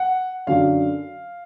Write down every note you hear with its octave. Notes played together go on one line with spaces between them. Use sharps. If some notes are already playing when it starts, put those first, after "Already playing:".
Already playing: F#5
F#2 D3 F#3 F5